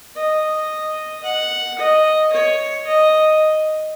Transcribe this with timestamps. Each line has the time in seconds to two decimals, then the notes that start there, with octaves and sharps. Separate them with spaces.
0.16 D#5
1.24 F#5
1.79 D#5
2.32 C#5
2.87 D#5